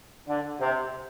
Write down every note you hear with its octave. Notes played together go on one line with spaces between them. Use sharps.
D3
C3